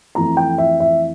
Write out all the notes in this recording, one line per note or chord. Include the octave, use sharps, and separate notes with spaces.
F2 E3 A3 A#5
G5
E5
E5